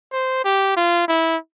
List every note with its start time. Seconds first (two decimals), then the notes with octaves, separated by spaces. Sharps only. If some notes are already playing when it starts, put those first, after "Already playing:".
0.13 C5
0.44 G4
0.77 F4
1.08 E4